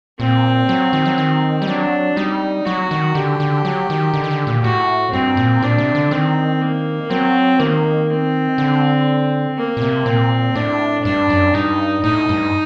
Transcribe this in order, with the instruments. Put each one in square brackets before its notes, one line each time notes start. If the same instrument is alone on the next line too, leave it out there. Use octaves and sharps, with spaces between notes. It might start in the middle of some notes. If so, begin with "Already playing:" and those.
[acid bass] A#2 [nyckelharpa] C4
[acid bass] F#3
D#3
F#3
D#3
G3
[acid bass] F#3 [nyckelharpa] D4
[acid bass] G3 [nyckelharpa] D#4
[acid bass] F#3 [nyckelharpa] F#4
[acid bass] D#3
[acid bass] D3 [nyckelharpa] G4
[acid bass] D3
F#3
D#3
D3
D#3
D3
A#2
[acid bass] A2 [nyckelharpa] F#4
[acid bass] G2 [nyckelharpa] C4
[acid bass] A#2
[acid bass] A#2 [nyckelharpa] D4
[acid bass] C3
D3
[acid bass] D#3 [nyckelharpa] C4
[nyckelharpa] A#3
[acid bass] F#3 [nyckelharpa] C4
[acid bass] D#3 [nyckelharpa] A#3
[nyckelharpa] C4
[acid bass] D3
[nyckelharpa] A#3
[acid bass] A#2
C3
[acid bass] A#2 [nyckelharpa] C4
[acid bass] A2 [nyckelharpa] D4
[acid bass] G2 [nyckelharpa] D4
[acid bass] F#2
[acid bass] G2 [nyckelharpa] D#4
[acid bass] A2 [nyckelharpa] D#4
[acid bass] G2